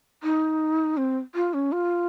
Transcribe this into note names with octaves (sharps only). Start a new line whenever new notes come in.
D#4
C4
F4
C#4
F4